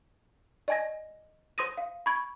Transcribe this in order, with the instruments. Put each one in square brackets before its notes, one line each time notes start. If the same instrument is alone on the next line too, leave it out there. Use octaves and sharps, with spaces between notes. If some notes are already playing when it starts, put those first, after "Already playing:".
[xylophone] D5 D#5 G#5 G#6 A#6
C5 C6 D#6 A#6 D#7
F5
B5 C#6 G#6